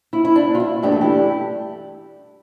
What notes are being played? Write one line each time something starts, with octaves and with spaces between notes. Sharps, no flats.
E4
E4
D4
F4
E4
G2 E3 A3 D4 G4
A4
E4 G4